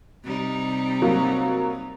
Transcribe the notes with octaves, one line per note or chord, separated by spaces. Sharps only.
C3 G3 D#4
F#3 A#3